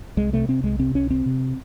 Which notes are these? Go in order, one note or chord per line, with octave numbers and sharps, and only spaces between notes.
C2 G#3
C3 A3
C3 C4
C2 G#3
C3 C4
C2 C#4
C3 C4
C3